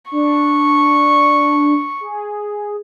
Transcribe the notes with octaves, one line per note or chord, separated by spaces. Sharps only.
D4 C#6
G#4